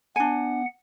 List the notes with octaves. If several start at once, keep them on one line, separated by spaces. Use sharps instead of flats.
B3 D4 F#5 G#5